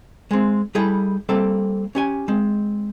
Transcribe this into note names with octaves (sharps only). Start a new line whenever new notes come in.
G#3 C4
G3 E4 G#4 A4
G3 A#3 C4 A4
C#4 G4 G#5
G#3 C4